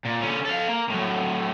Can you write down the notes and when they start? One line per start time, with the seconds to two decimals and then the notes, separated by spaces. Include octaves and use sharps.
0.05 A#2
0.21 D3 C#4
0.45 A4 F5
0.68 A#3
0.90 A2 F#3